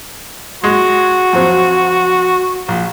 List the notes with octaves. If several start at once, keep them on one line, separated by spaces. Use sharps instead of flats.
G#3 F#4
F2 F#3 C4
A#1